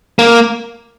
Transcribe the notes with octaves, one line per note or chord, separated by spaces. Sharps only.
A#3